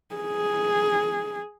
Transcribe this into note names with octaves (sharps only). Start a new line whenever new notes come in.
G#4